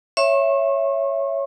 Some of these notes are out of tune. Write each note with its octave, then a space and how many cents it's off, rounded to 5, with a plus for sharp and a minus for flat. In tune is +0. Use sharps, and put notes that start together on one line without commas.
C#5 +0 E5 +10 C#6 -40